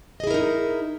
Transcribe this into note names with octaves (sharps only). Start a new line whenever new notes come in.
D#4 E4 G#4 A#4 D#5